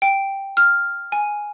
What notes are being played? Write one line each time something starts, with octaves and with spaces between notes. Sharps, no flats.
G5
F6
G#5